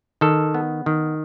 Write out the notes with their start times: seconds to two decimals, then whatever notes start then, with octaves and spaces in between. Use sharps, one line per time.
0.21 D#3 A4
0.54 B3
0.86 D#3